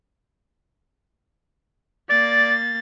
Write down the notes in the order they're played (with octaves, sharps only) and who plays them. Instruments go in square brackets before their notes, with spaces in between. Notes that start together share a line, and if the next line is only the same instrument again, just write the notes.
[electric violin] A#3 A6 [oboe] D5